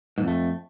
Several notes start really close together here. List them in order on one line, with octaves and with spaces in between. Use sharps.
G#2 F2 A3